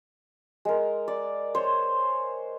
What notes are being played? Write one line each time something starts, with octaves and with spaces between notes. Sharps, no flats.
G#3 A#4
D5
C5 C#5